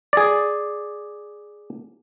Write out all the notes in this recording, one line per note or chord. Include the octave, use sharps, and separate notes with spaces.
G#4 D5